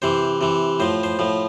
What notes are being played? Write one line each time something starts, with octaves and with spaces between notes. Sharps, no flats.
C3 E3 C5
C3 E3
A2 F3 C5
C5
A2 F3